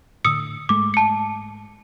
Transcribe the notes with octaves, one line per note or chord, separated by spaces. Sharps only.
A2 D3 D#6 E6 C#7
G#2 G#3 A3 D6
A5 C#7